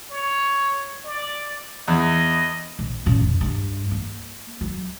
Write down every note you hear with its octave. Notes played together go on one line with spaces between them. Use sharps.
C#5
D5
E2 D#5
A#1
A#2 C#4
F1
G2
A#3
F#3